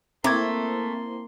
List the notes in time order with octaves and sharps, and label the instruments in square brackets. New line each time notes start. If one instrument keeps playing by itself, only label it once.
[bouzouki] A3 [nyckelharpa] A#3 C6 [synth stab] C4 E4 [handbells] A#5 D6 G#6